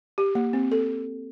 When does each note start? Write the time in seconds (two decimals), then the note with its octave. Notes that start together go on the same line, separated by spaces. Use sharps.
0.18 G4
0.35 A#3
0.53 C4
0.72 A4